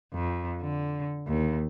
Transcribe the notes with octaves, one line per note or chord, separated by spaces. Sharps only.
F2
D3
D#2